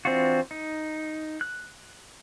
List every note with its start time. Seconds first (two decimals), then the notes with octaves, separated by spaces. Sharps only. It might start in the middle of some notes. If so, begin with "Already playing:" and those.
0.05 E3 C4 D4 F4 F#4
0.51 D#4
1.41 F#6